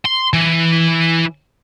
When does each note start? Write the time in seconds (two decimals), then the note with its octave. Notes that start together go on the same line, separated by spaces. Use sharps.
0.05 C6
0.33 E3